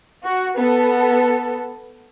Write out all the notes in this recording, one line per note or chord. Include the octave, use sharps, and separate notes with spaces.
F#4
B3 A4